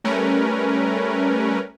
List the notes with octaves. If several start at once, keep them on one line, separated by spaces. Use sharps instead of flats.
G3 A3 C#4 A#4 B4